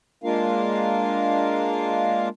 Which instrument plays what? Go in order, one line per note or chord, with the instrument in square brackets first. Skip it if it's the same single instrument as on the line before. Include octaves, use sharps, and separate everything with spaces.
[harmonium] G#3 A#3 D4 F4 A#4 F5